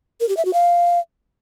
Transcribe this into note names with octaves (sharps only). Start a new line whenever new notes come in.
A#4
G4
E5
F#4
F5